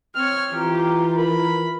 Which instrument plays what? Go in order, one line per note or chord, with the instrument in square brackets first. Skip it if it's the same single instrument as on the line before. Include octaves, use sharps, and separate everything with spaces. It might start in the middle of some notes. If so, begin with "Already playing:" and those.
[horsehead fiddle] C4 C#5 [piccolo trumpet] F6
[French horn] E3 [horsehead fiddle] F4 [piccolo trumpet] G4 [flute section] A#5
[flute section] A#4 [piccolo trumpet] B5